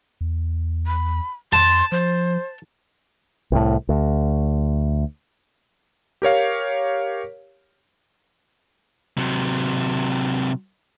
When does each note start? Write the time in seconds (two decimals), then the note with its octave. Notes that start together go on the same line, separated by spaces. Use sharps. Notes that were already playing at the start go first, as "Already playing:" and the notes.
0.21 E2
0.87 B5
1.53 F2 A5 C6
1.92 F3 C5
3.52 C2 A2
3.89 D2
6.22 G4 A#4 C#5 F5
9.18 C3 F#3